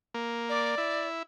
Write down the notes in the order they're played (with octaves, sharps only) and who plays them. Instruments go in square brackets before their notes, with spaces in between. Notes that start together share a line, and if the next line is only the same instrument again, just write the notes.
[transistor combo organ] A#3
[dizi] D5
[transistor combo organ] E4